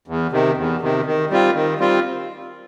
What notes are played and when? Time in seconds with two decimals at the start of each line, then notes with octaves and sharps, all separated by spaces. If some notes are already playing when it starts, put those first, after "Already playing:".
0.08 E2
0.31 C3 D#3
0.57 E2
0.81 C3 D#3
1.06 D#3
1.30 G3 C4 F4
1.55 D#3
1.79 G3 C4 F4